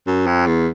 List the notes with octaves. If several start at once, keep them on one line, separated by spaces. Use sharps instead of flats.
F#2
F2
E2